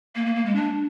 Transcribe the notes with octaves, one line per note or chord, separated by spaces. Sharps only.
A#3
A#3
A#3
G#3
D4